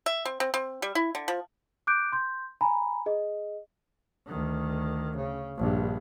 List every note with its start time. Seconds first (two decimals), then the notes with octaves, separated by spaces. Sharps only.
0.06 E5
0.25 C4
0.40 C4
0.54 C4
0.82 G3
0.95 E4
1.15 D3
1.28 F3
1.87 D6 F#6 G6 D7
2.12 C6 G6
2.61 G#5 A#5 B5
3.06 G#4 D#5
4.27 D2 D#3
5.16 C#3
5.57 A#1 G2